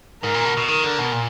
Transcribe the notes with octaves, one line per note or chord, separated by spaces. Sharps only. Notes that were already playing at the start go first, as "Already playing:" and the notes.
G#2 A#4
A#2
B2
B2
D#3 A#4
D3
B2
A#2